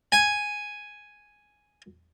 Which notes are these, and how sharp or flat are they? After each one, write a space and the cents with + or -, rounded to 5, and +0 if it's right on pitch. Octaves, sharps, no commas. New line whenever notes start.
G#5 +0